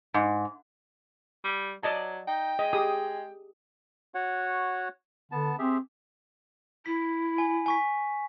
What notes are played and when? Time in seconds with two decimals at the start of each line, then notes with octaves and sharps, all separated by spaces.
0.14 G#2
1.44 G3
1.83 F#3 D5 D#5 A5
2.28 D#4 G5
2.59 G#3 D#5
2.73 G4 G#4 D#6
4.15 F#4 C#5 F#5
5.32 D3 B3 A5
5.59 C4 G4 G#4 E5
6.86 E4 B6
7.38 G#5
7.66 G#5 C#6 B6